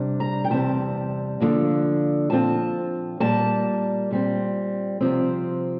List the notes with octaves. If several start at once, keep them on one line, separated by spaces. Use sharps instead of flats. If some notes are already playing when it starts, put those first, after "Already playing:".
Already playing: C3 G3 D4
A#5
G5
E2 C3 G3 C4 A5
D3 F3 A#3
A#2 F3 C4 A5
A#2 G3 A#3 A5
A#2 G3 C4
C3 F3 C4